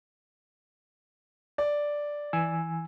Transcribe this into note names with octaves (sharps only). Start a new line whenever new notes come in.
D5
E3 G#5 E6